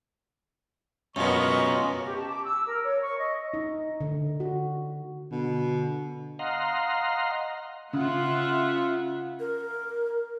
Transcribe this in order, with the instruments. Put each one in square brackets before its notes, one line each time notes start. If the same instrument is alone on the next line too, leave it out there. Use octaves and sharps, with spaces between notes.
[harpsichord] F#2 B2 [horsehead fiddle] B3 A#4 [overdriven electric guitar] C#4 F4 [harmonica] D#5 C#6
[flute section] C#6
G4
A5
D6
E6
A#4
C#5
C#6
D#5
[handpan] D#4
D3
F#4
[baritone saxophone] B2 [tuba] D3
[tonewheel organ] D#5 F5 F#5 A#5 C6
[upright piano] C#3 [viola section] F4 E5 F#5
[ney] A#4